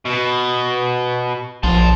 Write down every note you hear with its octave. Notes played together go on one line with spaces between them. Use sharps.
B2
A#1 A5 C6